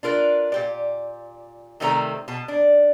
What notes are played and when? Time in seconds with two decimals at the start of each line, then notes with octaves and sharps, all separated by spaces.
0.03 D4 F4 A#4 B4
0.52 A#2 G4 D5
1.80 C3 D#3 G3 A3 C4 A#5
2.28 B2 A5
2.48 D4